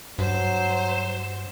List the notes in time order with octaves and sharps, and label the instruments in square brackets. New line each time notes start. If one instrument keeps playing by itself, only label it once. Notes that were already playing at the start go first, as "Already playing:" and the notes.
[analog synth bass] G2 [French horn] F#3 [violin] C5 E7